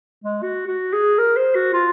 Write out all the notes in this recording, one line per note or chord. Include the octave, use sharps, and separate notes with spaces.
G#3
F#4
F#4
G#4
A#4
C5
F#4
F4